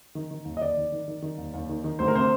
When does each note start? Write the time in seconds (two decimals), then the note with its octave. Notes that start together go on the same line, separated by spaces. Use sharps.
0.15 D#3
0.31 D#3
0.45 D#2
0.57 D#5
0.61 D#2 D5
0.77 D#3
0.92 D#3
1.08 D#3
1.22 D#3
1.38 D#2
1.54 D#2
1.69 D#3
1.84 D#3
1.99 D2 C5
2.08 A#4
2.15 C3 C5